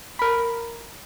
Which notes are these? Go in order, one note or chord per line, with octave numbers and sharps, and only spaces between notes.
A#4 B5